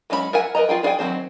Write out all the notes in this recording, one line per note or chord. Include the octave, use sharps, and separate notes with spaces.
F#3 G#3 C#4 F4 B5
A#4 E5 F#5 G#5
A#4 B4 D#5 A#5
F4 G#4 G5
D4 G#4 D5 G5 G#5
D#3 F#3 A3 C4 C5